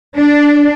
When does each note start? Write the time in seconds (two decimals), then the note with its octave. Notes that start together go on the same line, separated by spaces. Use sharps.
0.18 D4